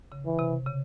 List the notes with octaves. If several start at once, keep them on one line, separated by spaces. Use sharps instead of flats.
C#3
E3
C3
C#3